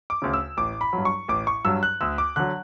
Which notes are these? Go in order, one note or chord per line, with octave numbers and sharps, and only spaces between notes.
D6
D2 C#3
E6
A1 D6
B5
F#3
G2
C#6
A1 D6
C#6
G2 F#3 E6
F#6
D2 E6
D6
D3 F#3 F#6